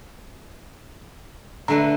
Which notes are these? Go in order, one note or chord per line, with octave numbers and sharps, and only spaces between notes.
D3 A3 B4 A#5